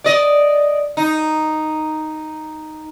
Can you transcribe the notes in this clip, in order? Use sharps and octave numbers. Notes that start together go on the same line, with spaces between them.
D5 D#5
D#4